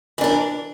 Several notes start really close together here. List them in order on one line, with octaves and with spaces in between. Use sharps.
E3 D4 A#4